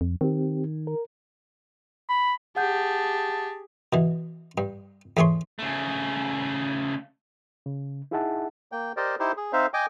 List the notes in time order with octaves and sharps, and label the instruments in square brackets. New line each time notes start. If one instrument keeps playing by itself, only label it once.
[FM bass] F2
[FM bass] D#3 [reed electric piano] C4 G4
[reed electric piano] A#4
[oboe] B5
[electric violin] G4 G#4 [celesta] F#5 G6 [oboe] A5
[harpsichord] B2 E3
G2
E2 A3 G#4 C#5 C6
[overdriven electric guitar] C#3 A3
[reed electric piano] C#3
D#4 E4 G#4 E5 F#5 A5
[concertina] A#3 G5
G4 A#4 C5 D5 D#5
D#4 E4 G4 C5
G#4
C4 D#4 C5 E5 F5
D#5 G5 G#5 D6